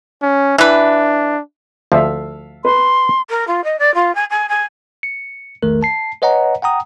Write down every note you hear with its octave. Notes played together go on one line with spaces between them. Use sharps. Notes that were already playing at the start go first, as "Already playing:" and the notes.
C#4
E3 D4 B4
D2 F3 A4 E5 F5
B4 C6
A#4
F4
D#5
D5
F4
G#5
G#5
G#5
C#7
A#1 E2 D#3 A3 A#4
A5 C7
B4 C#5 D#5 F#5 G#5 A#5
F#5 G5 A#5 D#6